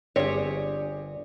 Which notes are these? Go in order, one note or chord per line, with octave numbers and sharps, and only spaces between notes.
G1 C4 D4 G4 G#4 C#5 D5